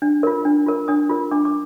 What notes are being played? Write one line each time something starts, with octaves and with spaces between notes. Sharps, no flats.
D4
F4 A#4
D4
F4 A#4
D4 D#6
F4 A#4
D4 D6
D6